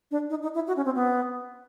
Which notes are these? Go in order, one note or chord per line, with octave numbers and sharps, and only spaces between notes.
D4
D#4
D#4
E4
F#4
C#4
C4
B3